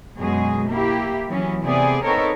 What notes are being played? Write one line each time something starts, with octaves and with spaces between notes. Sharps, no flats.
F#2 B2 F#3 G#3 G#4
A#3 E4 G4
E3 F#3 B3 C#4
C3 A3 B3 G#4 D5
B3 C4 D#4 A4 A#4 C#5